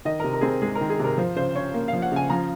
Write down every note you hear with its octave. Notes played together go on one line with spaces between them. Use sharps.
D#3 D#5
C3 A#4
A#4
C4 G#4
A#4
G#3 G#4
A#4
D#3
G#4
C3
A#4
F3 C5
C#3 C5
C#4 C#5
A#3
F3 F5
F#5
C#3 G#5
F3 A#5